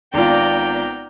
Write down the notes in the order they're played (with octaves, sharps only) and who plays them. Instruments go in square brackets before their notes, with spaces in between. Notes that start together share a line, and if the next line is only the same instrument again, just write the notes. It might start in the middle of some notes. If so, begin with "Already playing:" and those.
[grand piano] G#1 F4 [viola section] B3 D5 A#5 [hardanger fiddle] G5